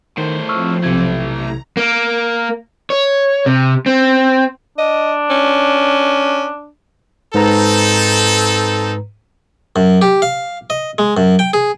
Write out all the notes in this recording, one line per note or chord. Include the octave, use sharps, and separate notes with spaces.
A2 D#3 C5
F3 C4 C#6 E6 F6
B1 C3 E3 A3 G#6
A#5
A#3
C#5
C3
C4
D4 D#5
C#4
G#2 C4 D#4 A4 B4 A#5
F#2
G4
F5
D#5
G#3
F#2
G5
G#4